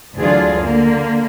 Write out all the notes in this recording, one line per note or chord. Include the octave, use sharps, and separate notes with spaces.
D2 E3 F#3 D4 F4 G#4
D3 A#3